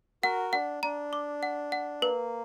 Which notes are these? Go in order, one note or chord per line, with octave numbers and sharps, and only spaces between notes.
F#4 A#4 F#5
D4 F#5
D4 A#5
D6
F#5
F#5
A#3 B4